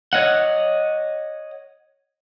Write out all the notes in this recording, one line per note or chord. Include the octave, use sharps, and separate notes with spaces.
C#5 D#5 F#5